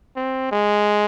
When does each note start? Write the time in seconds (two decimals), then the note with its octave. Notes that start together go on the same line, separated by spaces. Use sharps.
0.16 C4
0.52 G#3